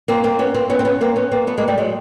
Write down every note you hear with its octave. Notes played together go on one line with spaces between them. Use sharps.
A#3 C4
A#3 C4
B3 C#4
A#3 C4
B3 C#4
C4
B3 C#4
A#3 C4
B3 C#4
A#3 C4
A3 B3
G#3 A#3
G3 A3
F#3 G#3